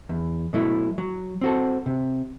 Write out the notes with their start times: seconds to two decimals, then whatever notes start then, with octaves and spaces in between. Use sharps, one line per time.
0.09 E2
0.53 B2 F#3 A3 E4
0.98 F#3
1.41 C4 F#4 A4
1.86 C3